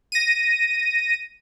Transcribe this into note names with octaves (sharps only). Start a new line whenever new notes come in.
A#6 D#7